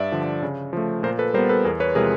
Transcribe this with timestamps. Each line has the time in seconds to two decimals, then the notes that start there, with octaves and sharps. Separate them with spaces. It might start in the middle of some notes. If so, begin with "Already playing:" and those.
Already playing: G2 D5 E5
0.12 D3 F3
0.43 C#3
0.73 F3 A3
1.03 A#2 A#4 C5
1.19 A4 B4
1.34 G3 A#4 C5
1.38 B3
1.49 A4 B4
1.65 E2 G#4 A#4
1.80 B4 C#5
1.95 C3 F3 G#3 G#4 A#4